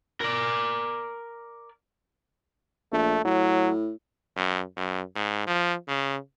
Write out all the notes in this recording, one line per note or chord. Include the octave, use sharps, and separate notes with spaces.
A#4 D5
A#1 A3
A2 F#3
F#2
F#2
G#2
F3
C#3